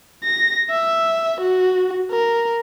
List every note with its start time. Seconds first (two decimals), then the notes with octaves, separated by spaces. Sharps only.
0.24 A#6
0.70 E5
1.40 F#4
2.12 A#4